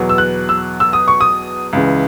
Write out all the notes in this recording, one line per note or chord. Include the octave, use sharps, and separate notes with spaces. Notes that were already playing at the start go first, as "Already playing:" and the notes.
Already playing: E2 B2 F#3 B3
E6
F#6
E6
E6
D#6
C#6
D#6
C#2 C#3 E3